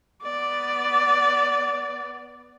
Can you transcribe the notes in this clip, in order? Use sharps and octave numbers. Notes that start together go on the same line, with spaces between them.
B3 D5